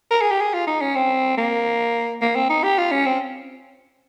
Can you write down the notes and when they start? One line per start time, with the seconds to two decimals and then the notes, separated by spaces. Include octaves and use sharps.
0.11 A#4
0.21 G#4
0.31 G4
0.41 G#4
0.53 F4
0.67 D#4
0.81 C#4
0.95 C4
1.37 A#3
2.22 A#3
2.36 C4
2.50 D#4
2.63 G4
2.78 F4
2.91 C#4
3.06 C4